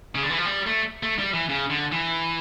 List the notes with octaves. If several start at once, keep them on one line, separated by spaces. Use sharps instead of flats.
C#3
D3
E3
F3
G3
A3
A3
G3
E3
C#3
D3
E3